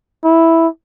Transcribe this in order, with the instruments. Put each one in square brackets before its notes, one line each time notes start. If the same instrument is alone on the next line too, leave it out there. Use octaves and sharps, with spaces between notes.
[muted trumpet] E4